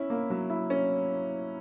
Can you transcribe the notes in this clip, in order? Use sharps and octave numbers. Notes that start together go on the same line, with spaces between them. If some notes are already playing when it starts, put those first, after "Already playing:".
Already playing: C#4 E4
A#3
F#3
E4
C#4